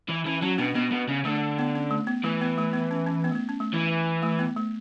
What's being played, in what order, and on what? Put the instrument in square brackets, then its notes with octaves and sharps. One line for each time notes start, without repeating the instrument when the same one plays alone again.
[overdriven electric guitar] E3
[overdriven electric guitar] E3 [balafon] C#4
[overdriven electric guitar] F#3 [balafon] C#4
[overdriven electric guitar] B2 [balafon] B3 D4
[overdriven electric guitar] B2 [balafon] B3
[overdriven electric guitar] B2
C#3
[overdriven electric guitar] D3 [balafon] A3
[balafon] B3
C#4
A3
B3
[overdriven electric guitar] E3 [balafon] A3
[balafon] B3
A3
B3
C#4
C#4
B3
A3
B3
C#4
A3
[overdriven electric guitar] E3
[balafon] A3
B3
A3